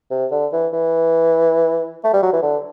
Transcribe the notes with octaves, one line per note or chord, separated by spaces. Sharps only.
C3
D3
E3
E3
A3
G3
F#3
E3
D3